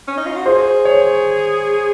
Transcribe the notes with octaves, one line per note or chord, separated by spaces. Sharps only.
C#4
D#4
F4
F#4
G#4 C5
C#5